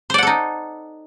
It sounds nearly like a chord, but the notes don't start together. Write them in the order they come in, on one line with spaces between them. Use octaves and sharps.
C5 D5 F#5 A4 D#4